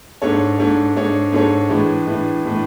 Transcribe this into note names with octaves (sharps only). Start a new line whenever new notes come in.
G#2 G#3 D4 A4 C#5
G#2 G#3 D4 A4 C#5
G#2 G#3 D4 A4 C#5
G#2 G#3 D4 A4 C#5
A2 E3 G#3 D4
A2 E3 G#3 D4
A2 E3 G#3 D4